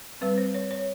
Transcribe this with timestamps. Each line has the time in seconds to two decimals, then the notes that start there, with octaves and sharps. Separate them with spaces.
0.21 G3 C4 B4
0.38 C5
0.54 C#5
0.71 C#5